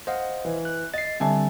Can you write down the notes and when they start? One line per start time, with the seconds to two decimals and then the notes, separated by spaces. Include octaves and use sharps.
0.07 C5 D#5 F5 F#5
0.45 E3
0.65 F#6
0.94 D#5 A6 C7
1.20 D3 G3 C4 E5 G#5 A5